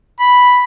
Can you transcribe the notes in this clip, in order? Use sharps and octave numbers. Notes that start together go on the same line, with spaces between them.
B5